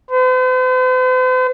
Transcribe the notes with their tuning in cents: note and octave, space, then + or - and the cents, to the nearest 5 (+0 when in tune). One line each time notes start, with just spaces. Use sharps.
C5 -45